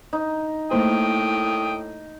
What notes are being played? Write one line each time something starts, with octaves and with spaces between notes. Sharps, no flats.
D#4
A2 A3 A#3 C5 G5 D#6